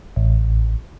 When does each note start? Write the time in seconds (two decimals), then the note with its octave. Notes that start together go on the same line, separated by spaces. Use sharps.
0.16 A1